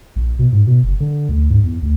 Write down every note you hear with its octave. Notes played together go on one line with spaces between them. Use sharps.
A#1
B2
G#2
B2
F#1
D3
D2
G#2
E2
D2